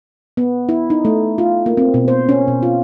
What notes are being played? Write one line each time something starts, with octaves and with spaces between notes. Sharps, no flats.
B3
E4
D#4
A3
F4
A#3
C4
B2
C5
C#4
B2
F4